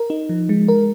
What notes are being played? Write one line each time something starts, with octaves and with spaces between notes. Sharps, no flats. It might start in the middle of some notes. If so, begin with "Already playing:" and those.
Already playing: A#4
D#4
F3
G#3
A#4